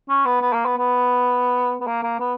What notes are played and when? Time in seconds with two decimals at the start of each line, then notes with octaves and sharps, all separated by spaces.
0.09 C#4
0.26 B3
0.41 B3
0.53 A#3
0.66 B3
0.78 B3
1.81 B3
1.87 A#3
2.03 A#3
2.20 B3